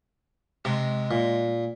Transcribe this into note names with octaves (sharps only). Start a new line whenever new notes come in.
C3 G#3
A#2